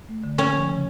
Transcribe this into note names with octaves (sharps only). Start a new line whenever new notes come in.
A3
D3
A#3 C#4
F3
C#3